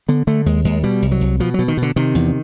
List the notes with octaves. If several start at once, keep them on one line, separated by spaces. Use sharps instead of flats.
D3 B3
D3 A3
D#2 G#3
D#2 G#3
B2 G3
C2
F#3
C2
B2 F3
B2 F#3
D#3
B2
D3
C3 D#3
E2